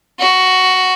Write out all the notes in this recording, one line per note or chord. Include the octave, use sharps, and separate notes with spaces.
F#4